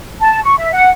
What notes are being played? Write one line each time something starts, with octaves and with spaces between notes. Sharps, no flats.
A5
C#6
E5
F#5